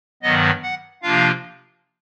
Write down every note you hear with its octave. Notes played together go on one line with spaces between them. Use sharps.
G2 D#3 F#3 B3 D#5
F#5
C3 F3 A#3 D4 F4 F5